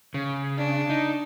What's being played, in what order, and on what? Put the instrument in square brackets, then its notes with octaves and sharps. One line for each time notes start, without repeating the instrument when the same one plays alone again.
[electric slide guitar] C#3
[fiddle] D4
[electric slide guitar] D#4